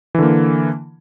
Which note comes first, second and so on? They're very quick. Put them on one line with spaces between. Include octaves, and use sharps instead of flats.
E3 D3 A#3